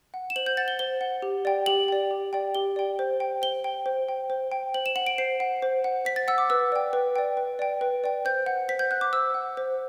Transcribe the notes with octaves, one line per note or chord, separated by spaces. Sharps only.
F#5
E7
C5 F#7
G6
F#5 A6
G7
C5 G7
F#5
G4
D5 G5
G4 F#7
D5 G5
G4
D5 G5
G4 G7
D5 G5
C5
G5
C5 G7
G5
C5
G5
C5
G5
C5 F#7
E7
F#5 F#7
D7
C5 C7
F#5
C5
F#5
C5 B6
A6
F#5 E6
D6
B4 E6
D5 G5
B4
D5 G5
B4
D5 G5
B4
D5 G5
C5 G6
F#5
C5 B6
G6
F#5 F#6
D6
C5 E6
F#5
C5